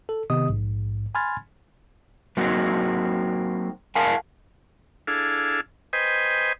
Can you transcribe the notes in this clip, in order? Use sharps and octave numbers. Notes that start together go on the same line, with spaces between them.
A4
C3 D#3 B3 G4 D#5 D#6
A#1 G#2
G#5 B5 C6 F6 G#6 A6
F#3 A#3 C4 D#4 F#4
A#4 F5 F#5 G#5 A5
D4 E4 G#4 A4 F5
B4 C5 D#5 G5 G#5